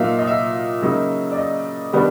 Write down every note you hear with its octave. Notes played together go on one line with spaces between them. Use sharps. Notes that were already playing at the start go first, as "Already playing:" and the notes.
Already playing: A#2 F#3 A#3 D#4 E5 F5
D#5
E5
C#3 F#3 A#3 D#4
D5
D#5
D#3 G3 B3 D4